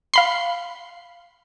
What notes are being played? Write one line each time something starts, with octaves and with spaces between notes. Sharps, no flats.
F5 B5 C6